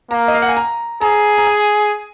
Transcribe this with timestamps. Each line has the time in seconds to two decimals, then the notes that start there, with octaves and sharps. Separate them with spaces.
0.11 A#3 A#5
0.28 D#5
0.34 F5
0.42 F#5
0.49 G#5
0.57 A#5
1.01 G#4 A#5
1.38 A#5
1.47 G#5